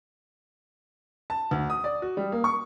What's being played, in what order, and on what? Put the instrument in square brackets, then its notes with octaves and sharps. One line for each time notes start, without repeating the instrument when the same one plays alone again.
[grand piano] A5
D2
D#6
D5
F#4
G3
A#3
C#6